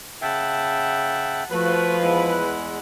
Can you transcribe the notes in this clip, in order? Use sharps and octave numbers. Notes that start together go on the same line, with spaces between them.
C#3 E5 F#5 G5 A5
F3 A3 F#4 B4
E2 G#3 E4 F#5